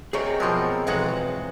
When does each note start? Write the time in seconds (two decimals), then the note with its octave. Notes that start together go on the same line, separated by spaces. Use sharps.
0.13 C3 G4 G#4 A#4 C#5 D#5
0.40 B2 F3 F#3 C4 A#4
0.87 B1 E3 F3 G#3 F#4 F#5